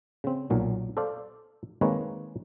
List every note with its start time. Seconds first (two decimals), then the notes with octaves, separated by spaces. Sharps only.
0.24 C#3 C4
0.50 B1 A#2 F#3
0.97 A4 C5 D5 F5
1.81 D#3 G#3 A#3 C4 B4 C#5